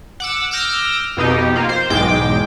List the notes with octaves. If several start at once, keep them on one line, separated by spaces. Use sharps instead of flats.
F#5 D6 E6
D6 E6 F6 G6 A#6
F2 B2 D#4 G4
A#3 F4
C5
B1 E2 G#2 G#3 G5 D6